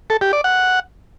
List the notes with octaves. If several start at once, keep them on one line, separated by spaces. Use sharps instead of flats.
A4
G4
D5
F#5